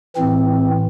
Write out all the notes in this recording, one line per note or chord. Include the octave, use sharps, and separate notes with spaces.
A2 E3 C4